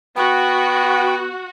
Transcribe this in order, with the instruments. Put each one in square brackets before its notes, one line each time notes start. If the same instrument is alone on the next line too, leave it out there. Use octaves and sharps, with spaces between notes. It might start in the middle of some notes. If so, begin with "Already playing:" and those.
[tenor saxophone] B3 [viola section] F#4 [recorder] G5